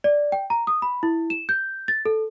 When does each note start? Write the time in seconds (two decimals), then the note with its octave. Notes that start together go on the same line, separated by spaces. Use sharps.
0.04 D5
0.32 G5
0.50 A#5
0.67 D#6
0.82 B5
1.03 E4
1.30 E7
1.49 G6
1.88 A6
2.06 A4